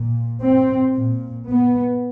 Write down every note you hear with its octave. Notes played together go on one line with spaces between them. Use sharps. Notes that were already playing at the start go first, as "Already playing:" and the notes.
Already playing: A#2
C4
A#2
B3